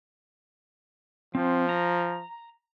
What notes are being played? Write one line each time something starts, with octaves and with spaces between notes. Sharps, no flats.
F3 C4
A#5